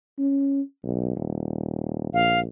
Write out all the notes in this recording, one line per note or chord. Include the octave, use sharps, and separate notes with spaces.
C#4
B1
D#1
A#1 F5